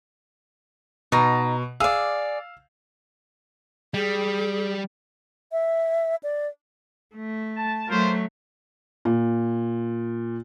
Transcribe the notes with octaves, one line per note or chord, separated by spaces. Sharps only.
B2 D#4 A5 A#5
G#4 D5 F5 E6
G3 G#4
E5
D5
A3
A5
F#3 A3 F4 A#4 C5
A#2